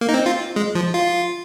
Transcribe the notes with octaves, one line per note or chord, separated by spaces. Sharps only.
A#3
D#4
C4
F4
G#3
F3
F4